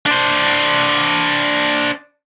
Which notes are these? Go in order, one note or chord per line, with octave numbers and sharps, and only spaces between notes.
D4 C5